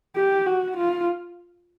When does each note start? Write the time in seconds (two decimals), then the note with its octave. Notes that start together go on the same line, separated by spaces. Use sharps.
0.16 G4
0.46 F#4
0.77 F4